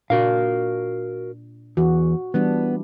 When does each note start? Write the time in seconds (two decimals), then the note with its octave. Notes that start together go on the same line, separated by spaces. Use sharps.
0.10 A#2 D4 F#4 A#4 F5
1.77 E2 F#4
2.34 E3 G3 B3 D4